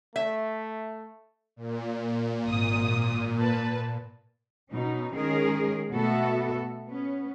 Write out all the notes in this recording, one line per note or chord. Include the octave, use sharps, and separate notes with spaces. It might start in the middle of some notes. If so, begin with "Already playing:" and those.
A3 E5
A#2
G#1 D#6
B4 A5
B2 C#4 D#4
D#3 G#3 C#4 G#4 A#4
B2 A3 B3 F#4 A4 E5
B3 C#4